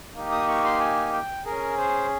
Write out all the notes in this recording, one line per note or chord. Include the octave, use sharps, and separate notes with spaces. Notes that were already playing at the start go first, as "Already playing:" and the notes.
A#3 D#4 G4
D#6
C#6
C6
G#5
G5
C#4 G#4 A#4
C5